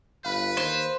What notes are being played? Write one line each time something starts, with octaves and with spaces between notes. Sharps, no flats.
G1 B4 F5 B5 F#6
D#2 C5